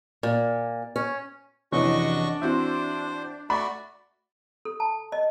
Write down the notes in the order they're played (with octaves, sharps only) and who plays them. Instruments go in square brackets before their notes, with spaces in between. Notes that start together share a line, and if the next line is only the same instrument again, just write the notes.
[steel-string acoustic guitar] A#2
C#4
[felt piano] F1 [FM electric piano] E3 C#4 [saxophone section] D4 [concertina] F#4 D#5 C#6
[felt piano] E3 C4 F#4 [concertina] C5 [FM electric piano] E5
[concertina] A3 F#4 D5 [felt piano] B5
[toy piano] A4
A5
D#5